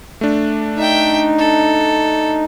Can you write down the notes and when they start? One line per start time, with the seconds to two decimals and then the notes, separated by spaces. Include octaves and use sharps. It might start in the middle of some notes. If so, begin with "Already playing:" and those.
0.21 A3 D4
0.78 D#4 E5 G5
1.39 A4